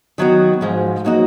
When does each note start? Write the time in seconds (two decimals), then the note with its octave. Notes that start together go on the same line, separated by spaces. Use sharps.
0.18 D#3 F#3 B3 F#4
0.61 G#2 F3 G#3
1.05 F#3 A#3 D#4 F#4